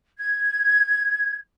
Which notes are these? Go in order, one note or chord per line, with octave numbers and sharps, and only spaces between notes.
G#6